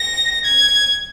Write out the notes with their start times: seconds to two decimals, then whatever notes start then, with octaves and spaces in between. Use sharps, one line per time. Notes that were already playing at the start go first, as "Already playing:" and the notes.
Already playing: A#6
0.45 G#6